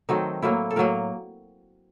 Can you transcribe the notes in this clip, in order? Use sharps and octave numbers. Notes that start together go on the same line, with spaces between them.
D#3 F#3 A3 C4 D#4
A2 F#3 A#3 E4
A4
A2 F#3 A#3 A#4